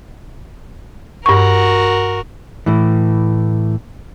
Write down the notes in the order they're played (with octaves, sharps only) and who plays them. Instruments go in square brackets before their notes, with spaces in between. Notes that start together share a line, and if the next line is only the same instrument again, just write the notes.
[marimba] G2 C#6 [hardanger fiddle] F#4 A#4
[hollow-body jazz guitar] A2 E3